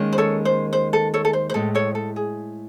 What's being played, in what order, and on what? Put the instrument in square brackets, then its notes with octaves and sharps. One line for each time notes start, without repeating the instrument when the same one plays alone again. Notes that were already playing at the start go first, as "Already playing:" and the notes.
Already playing: [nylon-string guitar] D#2 D#3 G#3 C#4
[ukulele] C5
A4 C#5
C5
C5
A4
A4 C#5
A4
C5
C5
[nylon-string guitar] A2 G#3 C4 [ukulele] A4
[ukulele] A4 C#5
A4
G#4